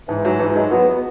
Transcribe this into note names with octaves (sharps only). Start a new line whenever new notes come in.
G#2 E3
E3 F#3
G#2 E3
F#3 G#3
F#3 B3
B3